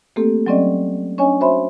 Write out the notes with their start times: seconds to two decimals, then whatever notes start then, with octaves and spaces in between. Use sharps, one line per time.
0.16 A3 A#3 C4 G4 A4
0.46 F#3 G3 C4 C#4 D5 D#5
1.18 C#4 D4 C#5 D#5 G#5
1.41 F#4 C5 C#5 E5 B5 C6